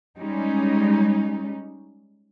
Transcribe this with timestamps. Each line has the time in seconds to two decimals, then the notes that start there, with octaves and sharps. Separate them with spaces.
0.18 G3 G#3 C#4 D#4